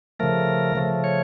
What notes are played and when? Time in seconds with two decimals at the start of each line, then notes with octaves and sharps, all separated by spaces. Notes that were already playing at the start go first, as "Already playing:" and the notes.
0.20 C#3 F3 A3 A#4
0.76 C#3 F3 A3
1.04 C#5